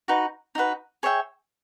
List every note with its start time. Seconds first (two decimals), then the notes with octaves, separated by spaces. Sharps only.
0.08 D#4 F#4 B4
0.55 D#4 F#4 B4
1.03 G#4 C#5 E5 G5